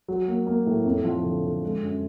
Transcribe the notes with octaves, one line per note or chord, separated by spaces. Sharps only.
F#3
A#3
A#3
A2
F2
F3
D3
D3
G#3
F#2